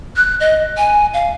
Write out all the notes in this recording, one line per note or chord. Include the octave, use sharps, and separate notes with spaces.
F#6
D#5
G#5
F5